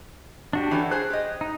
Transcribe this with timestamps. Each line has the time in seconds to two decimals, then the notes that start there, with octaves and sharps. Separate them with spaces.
0.53 D4 F#4 G4
0.71 E3 A3 C#4
0.91 G#4 C5 F#6
1.10 G4 D#5
1.41 D#4